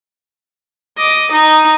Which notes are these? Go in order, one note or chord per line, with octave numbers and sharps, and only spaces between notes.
D#5 D6
D#4